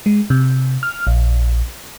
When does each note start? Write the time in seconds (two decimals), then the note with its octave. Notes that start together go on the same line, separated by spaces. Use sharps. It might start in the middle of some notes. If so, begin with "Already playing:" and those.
0.06 G#3
0.30 C3
0.83 F6
1.07 A#1